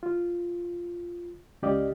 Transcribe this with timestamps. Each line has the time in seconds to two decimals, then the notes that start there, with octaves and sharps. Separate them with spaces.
0.03 F4
1.62 C#2 C#4 G4 D5 D#5 F5